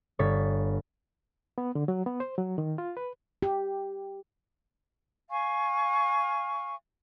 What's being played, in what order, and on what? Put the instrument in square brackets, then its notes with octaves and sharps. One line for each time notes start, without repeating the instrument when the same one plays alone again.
[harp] G1 C#5 A6 B6
[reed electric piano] B3
D3
F#3
B3
C5
F#3
D#3
F4
B4
[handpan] G4
[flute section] F5 G#5 C#6